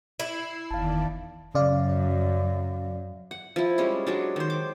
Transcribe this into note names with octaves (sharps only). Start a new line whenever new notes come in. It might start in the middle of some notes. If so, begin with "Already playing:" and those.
E4 E6 C7
F#1 E2 D#3 D5 F5 A5
F#2 C#3 D5 F5
F#5
F3 E4
G3 G#3 C#4
F#3 G#3 D4
D#3 C5
D6